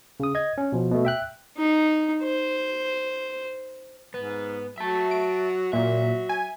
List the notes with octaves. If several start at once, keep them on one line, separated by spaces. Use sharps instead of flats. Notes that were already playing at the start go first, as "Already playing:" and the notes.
C#3 D#6
D#5 G#6
C#4
B2 F3
B2 A3
E5 G5 F#6
D#4
C5
G#2 B3
F#3 E5 A5
D7
A#2 F#3 E5
G#5